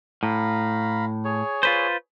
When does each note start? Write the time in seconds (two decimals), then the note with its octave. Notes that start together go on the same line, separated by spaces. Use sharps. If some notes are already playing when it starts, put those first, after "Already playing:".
0.23 A2 F5 A#5 B5
1.25 G#4 C#5
1.63 F4 B4 C5